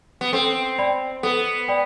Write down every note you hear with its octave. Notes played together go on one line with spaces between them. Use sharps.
B3
C4 A4
D5 G5 B5
B3 A4
D5 G5 B5